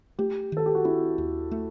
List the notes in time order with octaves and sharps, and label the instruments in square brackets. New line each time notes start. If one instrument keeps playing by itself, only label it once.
[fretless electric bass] A3 [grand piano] G4
[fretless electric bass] D#3 [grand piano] A4
[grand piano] G4
F#4
[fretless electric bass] C4 [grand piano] E4
[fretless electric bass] D#2
A3